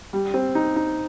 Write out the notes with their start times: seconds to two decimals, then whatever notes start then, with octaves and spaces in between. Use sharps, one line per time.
0.13 G3
0.34 C4
0.55 D#4
0.76 D#4